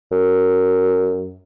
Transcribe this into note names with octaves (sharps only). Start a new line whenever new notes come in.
F#2